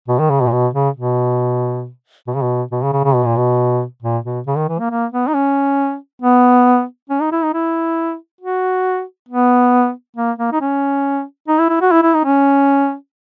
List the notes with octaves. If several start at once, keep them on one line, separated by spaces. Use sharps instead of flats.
B2
D#3
C#3
B2
A#2
B2
C#3
B2
B2
C#3
B2
B2
C#3
C#3
C#3
B2
A#2
B2
A#2
B2
C#3
D#3
E3
A#3
A#3
B3
D#4
C#4
B3
C#4
D#4
E4
D#4
E4
F#4
B3
A#3
A#3
D#4
C#4
D#4
E4
E4
F#4
E4
E4
D#4
C#4